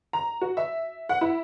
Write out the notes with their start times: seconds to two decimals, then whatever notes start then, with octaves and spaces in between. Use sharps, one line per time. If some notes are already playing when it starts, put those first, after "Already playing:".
0.13 A#5
0.41 F#4
0.57 E5
1.09 F#5
1.21 E4